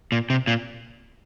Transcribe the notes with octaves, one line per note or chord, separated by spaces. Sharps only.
A#2
C3
A#2